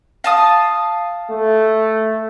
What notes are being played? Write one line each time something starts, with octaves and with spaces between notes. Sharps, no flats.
F5 A5 D#6
A3